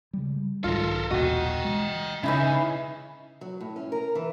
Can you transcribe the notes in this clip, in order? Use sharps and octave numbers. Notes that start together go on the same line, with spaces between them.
C#3 G3
B1 G#2 D#3 F4 A4 A#4
D#1 A#1 B2 F#4 D#5 G5
G#3
C#3 E3 C#4 D#4 E4
F#3
A2
C#4
A#4
E3